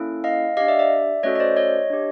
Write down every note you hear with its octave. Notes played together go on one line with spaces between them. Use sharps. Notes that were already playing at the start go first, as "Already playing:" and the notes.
Already playing: A#3 C#4 E4 A4
D#5 F5
D4 G4 D#5 F5
D5 E5
D5 E5
A3 C#4 F#4 A4 C#5 D#5
D#5
C5 D5
C#5 D#5
D4 G4